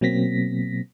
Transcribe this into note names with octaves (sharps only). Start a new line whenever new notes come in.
B2 F#3 A#3 C4 A#6 B6